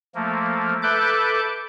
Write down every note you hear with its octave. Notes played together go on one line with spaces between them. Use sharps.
F3 A3 A#3
A4 B4 E5 D6 F#6 G6